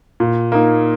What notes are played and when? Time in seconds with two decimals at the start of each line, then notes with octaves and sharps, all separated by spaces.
0.20 A#2
0.52 A#3 D#4